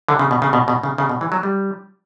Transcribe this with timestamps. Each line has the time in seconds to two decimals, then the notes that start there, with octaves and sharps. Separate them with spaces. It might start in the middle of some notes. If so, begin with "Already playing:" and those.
0.09 D3
0.19 C#3
0.31 B2
0.42 C#3
0.53 B2
0.68 B2
0.83 C#3
0.98 C#3
1.09 B2
1.21 E3
1.32 F#3
1.43 G3